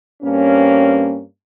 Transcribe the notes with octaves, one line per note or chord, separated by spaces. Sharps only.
G2 A#3 C4 C#4